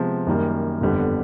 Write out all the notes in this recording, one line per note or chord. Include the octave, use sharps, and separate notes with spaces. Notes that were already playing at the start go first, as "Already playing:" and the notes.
Already playing: C3 F3 G#3 B3
F#2 D#3 G3 A#3
G1 F2 D3 G3 B3